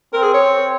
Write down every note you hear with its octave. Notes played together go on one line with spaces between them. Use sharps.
C4 A#4
G#4
C#5
C4